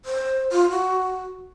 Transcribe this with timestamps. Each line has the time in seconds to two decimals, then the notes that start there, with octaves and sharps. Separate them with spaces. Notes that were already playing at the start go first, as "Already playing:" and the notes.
0.05 C5
0.52 F4
0.70 F#4